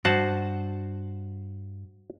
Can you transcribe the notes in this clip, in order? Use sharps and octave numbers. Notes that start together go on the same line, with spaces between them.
G2 F#4 C5 F#5 A5